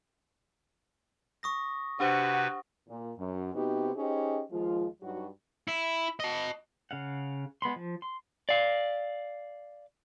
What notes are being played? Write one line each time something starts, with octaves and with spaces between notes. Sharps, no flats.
C#6 D#6 A#6
C3 D4 F#4 G4 B4 C5 F#5
A#2
F#2
C3 B3 C4 D#4 F#4 G4
C#4 D#4 G4 G#4 C5 D#5
D#2 F3 G#3 F4
G2 F#3 D#4 F#4
E4
D#5 A5
C#3 F5 F#5
G#3 B3 B5 C6
F3
C6
D5 F5